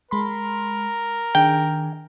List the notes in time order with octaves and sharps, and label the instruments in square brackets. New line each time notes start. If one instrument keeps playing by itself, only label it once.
[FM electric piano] G#3 B5 C6 [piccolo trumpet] A#4
[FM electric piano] D#3 D4 G#4 [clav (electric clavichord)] G5